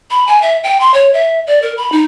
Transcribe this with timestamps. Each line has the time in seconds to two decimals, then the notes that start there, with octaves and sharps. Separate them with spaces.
0.11 B5
0.27 G#5
0.42 E5
0.64 G5
0.80 C6
0.94 C#5
1.14 E5
1.47 D5
1.62 A#4
1.77 B5
1.92 D#4